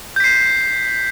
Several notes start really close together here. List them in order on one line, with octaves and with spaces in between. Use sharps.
G6 B6 C7